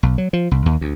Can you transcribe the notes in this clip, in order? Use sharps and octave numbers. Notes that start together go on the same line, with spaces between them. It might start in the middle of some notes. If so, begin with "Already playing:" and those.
B1
F#3
F3
C2
D#2
D2